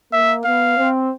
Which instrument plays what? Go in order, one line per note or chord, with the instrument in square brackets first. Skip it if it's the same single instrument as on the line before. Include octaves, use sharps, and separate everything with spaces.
[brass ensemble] A#3 [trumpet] E5
[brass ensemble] B3 [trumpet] F5
[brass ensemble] C4